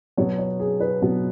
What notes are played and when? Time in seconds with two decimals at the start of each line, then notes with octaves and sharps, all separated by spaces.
0.17 B2 F#3 B3 C#5
0.38 C#5
0.60 G#4
0.80 B4
1.02 B2 F#3 B3